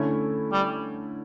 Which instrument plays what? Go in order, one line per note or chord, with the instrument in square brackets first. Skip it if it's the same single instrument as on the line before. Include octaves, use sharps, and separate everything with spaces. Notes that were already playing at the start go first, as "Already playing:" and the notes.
Already playing: [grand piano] D3 A3 C#4 E4
[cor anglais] G3